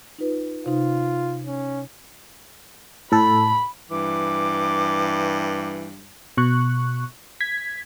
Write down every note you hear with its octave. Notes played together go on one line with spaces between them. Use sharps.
D#4 F4 B4
C3 D#4 F4
C#4
A2 A4 B5
G2 E3 D6
B2 C#6 F#6
G#6 B6